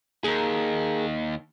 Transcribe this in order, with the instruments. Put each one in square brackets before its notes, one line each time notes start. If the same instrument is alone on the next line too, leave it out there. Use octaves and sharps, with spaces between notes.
[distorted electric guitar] D#2 [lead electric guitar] G#4 A#4